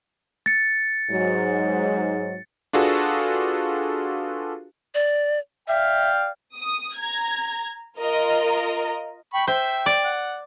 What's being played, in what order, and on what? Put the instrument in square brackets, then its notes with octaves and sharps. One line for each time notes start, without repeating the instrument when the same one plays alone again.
[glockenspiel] A6 C#7
[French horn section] G#2 F#3
[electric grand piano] D4 F4 F#4 G#4 A4 B4
[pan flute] D5
[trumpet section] D5 F5 G5 [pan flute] E5
[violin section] D#6
A#5 G#6
F4 A#4 D#5 A#5
[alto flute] G5 [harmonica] B5 C#6
[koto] C5 [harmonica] E5 [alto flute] G5
[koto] D5
[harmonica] F#5